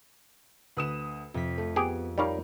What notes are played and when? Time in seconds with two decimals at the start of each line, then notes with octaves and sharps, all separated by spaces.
0.77 D2 B4 D#6 E7
1.34 F2 C3 B6
1.58 A3
1.76 B3 G4 G#4 D7
2.18 G3 D#4 A#4 C#5 F5 B5